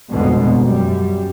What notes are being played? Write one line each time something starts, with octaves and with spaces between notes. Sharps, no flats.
G1 F2 G#2 B2 D3 B3
F#2 G3